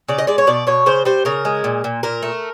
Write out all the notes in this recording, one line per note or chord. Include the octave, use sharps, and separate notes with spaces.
C#3 D5
D#5
G#3 D5
C#5
B2 D5
B2 C#5
C#3 C5
G3 C5
C#3 A#4
G#3
A#2
A#2
A#2 A#4
A3